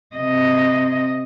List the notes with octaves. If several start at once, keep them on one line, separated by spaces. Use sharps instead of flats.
C3 D#5